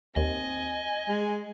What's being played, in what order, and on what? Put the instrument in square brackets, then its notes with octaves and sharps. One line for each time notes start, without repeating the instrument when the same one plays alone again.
[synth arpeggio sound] D#2 [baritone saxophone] C4 [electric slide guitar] D#5 [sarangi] G#5
[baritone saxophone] G#3